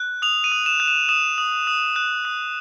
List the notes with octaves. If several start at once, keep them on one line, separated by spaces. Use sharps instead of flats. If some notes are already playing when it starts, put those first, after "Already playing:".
Already playing: F#6
D#6 F7
D#7
D#6
E7
F#6
E7
D#6 E7
D#6
D#6
F#6
D#6